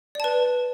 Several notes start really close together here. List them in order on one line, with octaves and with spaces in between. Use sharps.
D5 A5 B4